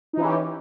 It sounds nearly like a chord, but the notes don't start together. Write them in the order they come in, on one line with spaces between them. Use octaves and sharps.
D#4 E3 C#4 G4